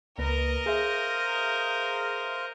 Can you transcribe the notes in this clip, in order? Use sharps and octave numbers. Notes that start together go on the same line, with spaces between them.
C#2 A#3 A#4 B4 D#5 A#5
G#4 C5 E5 F5